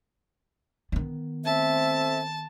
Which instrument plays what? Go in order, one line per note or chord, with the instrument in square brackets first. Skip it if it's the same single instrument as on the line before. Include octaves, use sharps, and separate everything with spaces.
[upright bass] D#3 B3
[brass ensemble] A3 C4 [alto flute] E5 [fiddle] A5